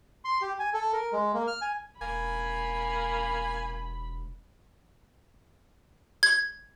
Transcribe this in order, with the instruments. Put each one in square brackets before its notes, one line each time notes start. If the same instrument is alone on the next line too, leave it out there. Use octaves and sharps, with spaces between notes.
[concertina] C6
G4
G#5
A4
A#4
G#3
A#3
F6
G#5
[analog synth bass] E1 [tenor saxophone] A#3 [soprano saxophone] G#5 [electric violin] B5
[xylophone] G#6